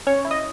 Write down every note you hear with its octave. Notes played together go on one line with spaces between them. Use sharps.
C#4 C#5
E4
D#5